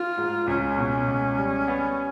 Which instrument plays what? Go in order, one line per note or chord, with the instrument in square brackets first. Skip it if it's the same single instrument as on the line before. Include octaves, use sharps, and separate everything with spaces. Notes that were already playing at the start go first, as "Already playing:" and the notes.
Already playing: [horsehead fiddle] F4
[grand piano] G#2
[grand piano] C#2 [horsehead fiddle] C#4
[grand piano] B2
C#2
G3
B3